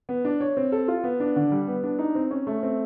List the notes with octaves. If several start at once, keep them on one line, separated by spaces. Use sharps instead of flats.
B3
D4
C#5
C4
A4
F4
B3
D4
D3
G3
B3
D4
D#4
C4
C#4
A3
C4